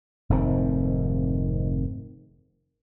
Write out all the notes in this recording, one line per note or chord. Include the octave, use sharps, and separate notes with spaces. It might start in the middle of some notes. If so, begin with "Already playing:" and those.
F1 G#2 D#3 C4